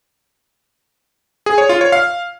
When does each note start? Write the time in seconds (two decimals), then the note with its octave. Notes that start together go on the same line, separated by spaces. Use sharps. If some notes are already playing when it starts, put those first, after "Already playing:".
1.46 G#4
1.58 C#5
1.69 F4
1.81 C#5
1.92 F5